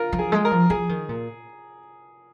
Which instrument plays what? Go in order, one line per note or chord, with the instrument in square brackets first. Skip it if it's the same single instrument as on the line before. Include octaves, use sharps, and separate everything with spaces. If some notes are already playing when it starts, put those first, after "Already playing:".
Already playing: [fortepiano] F4 A#4
[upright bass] F3
[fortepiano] G#4
[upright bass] G#3
[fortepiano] A#4
[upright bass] F3
[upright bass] F3 [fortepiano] G#4
[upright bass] D#3
A#2